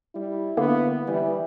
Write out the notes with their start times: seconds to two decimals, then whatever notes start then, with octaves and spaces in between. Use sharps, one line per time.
0.15 G3 E4
0.57 D3 A#3 B3
1.07 E3 G3